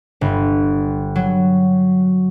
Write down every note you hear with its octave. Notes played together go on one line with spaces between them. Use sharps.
G1
F#3